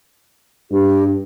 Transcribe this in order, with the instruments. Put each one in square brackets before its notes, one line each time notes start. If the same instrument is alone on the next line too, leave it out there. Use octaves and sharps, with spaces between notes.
[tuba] G2 [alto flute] G4